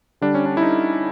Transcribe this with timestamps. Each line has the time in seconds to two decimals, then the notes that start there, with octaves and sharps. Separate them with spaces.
0.21 D3 G3 D4
0.35 C#4
0.46 D4
0.57 E4
0.62 D#4